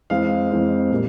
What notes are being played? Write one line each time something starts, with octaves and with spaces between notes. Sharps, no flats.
F2 E3 G#3 C4 F5
F2 E3 G#3 C4
A#2 G3 A#3